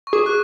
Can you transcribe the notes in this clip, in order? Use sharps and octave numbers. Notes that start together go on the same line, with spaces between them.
C#6
G#4 D6
F#6